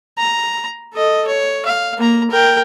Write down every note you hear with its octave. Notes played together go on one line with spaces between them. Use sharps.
A#5
A4 D#5
C#5
F5
A#3 A#5
A#4 G5